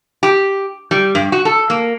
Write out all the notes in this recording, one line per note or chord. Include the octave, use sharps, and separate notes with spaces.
G4
G3
G2
F#4
A4
A#3